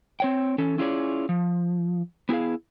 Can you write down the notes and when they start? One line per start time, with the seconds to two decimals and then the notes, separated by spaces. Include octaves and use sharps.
0.20 C4 C#5 G5
0.58 E3 C#4 A4
0.78 C#4 E4 F4 G#4 C#5 D5
1.29 F3
2.29 B3 E4 F#4 G#4 F5